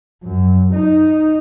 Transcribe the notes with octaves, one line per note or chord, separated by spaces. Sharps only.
F#2
D#4